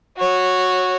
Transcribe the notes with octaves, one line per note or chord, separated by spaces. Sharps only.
F#4 C#5